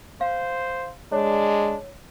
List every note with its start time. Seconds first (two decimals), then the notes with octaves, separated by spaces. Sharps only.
0.21 C5 F5
1.12 G#3 D4 C#5